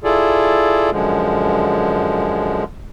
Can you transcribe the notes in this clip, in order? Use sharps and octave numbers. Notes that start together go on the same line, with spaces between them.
E4 F4 G#4 A4 D5
F#2 D3 F3 G#3